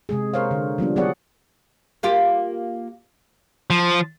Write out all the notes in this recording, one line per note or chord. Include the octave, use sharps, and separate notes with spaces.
C3 G#3 G#4
A#4 C5 C#5 F5
D3
F3 G3 B3 D4
F#3 B3 G#4 C#5 D5 F#5
A#3 F4 G4
F3